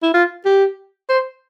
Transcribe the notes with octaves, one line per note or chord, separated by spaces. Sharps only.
E4
F4
G4
C5